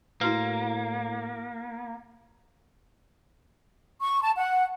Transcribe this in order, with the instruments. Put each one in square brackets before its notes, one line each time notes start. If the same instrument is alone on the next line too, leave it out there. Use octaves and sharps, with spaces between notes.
[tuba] A2 [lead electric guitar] A#3 [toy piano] E4 F#4 B4
[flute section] C#6
A5
F#5